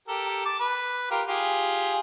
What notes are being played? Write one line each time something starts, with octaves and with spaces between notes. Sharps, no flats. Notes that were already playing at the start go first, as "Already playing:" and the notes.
G4 A4 A#4
A5 D6
B4
F4 G4 A#4
F4 G4 G#4